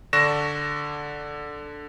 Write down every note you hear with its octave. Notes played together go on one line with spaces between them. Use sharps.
D3 D4 C#6 A#6 E7